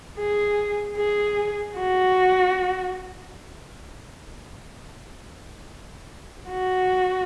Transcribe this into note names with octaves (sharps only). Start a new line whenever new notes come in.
G#4
G#4
F#4
F#4